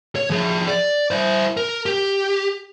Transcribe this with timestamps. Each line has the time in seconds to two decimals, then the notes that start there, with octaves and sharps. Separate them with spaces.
0.15 C#5
0.30 F3 G#4
0.68 D5
1.11 E4 C5
1.57 A#4
1.86 G4